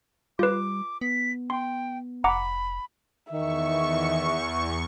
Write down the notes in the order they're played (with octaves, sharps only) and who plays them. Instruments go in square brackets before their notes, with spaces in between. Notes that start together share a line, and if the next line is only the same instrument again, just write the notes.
[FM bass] G3 [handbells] F4 B4 [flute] D6
[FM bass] B3 [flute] B6
[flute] G5 [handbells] C6
[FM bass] F1 [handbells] F#5 A#5 D6 [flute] B5
[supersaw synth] E2 C#6 [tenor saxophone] D#3 [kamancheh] E5